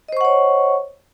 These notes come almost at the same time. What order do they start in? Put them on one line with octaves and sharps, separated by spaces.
D#5 C5 C#6 F#5 C#5